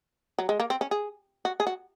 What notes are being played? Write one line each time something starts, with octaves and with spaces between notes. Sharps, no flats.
F#3
G#3
A#3
C4
C#4
G#4
F#4
G#4
F#4